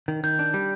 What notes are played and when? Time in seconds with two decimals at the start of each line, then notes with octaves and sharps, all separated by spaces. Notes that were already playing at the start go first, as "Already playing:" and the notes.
0.08 D#3
0.24 D#3 G6
0.39 D4
0.54 G3